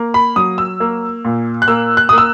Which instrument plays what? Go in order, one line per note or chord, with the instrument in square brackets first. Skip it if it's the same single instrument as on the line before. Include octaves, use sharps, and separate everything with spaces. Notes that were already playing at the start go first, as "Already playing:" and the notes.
Already playing: [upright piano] A#3
B5
F#3 D#6
E6
A#3
A#2
F#6
A#3 E6
F#6
A#3 D#6
E6